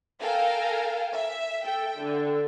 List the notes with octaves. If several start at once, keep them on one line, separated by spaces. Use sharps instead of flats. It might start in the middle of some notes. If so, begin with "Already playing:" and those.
A4 A#4 F5 G5 G#5
E5
A4 G5
D3